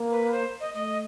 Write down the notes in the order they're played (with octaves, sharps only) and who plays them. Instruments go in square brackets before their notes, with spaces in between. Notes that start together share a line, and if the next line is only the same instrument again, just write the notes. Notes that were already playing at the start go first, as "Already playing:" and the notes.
Already playing: [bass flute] A#3
[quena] B4
C5
D#5
[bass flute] A3 [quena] D#5